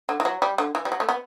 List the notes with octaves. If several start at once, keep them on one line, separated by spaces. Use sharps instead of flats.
D3
E3
F#3
G3
D3
E3
G3
F#3
A3
B3